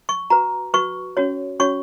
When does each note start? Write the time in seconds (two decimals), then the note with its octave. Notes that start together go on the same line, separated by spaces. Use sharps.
0.09 C#6
0.30 F#4 B4 A#5
0.74 F#4 B4 C#6
1.17 C#4 F#4 C#5
1.60 C#4 F#4 C#5 C#6